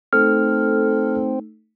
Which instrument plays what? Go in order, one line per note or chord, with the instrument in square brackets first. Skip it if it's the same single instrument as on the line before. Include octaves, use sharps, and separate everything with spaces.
[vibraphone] A3 D#4 [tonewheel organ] C4 [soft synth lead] A4 [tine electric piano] F6